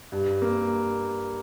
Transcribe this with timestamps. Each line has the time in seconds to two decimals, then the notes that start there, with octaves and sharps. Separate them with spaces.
0.12 G2
0.42 A#3